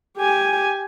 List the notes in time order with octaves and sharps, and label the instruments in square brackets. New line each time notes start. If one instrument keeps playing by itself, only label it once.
[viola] G4 G#5